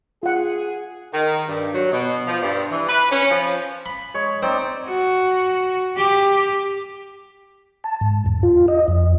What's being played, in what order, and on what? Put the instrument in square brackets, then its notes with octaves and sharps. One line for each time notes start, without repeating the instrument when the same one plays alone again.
[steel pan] F4 F#5 [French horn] G#4
[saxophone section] D#3
G2
F#3
B2
F3
G2
E3
B4
C#4
F3
[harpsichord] B5
[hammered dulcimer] G#3 C#5
[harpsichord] C4 [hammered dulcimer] D#4 D5
[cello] F#4
G4
[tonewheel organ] A5
G#2
E2
F4
D#5
F2